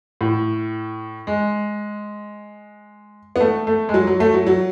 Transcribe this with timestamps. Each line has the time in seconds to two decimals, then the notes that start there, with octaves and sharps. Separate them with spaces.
0.21 A2
1.27 G#3
3.36 B3
3.40 A3
3.67 A3
3.89 G#3
3.94 F#3
4.07 F#3
4.20 A3
4.34 F#3
4.47 F#3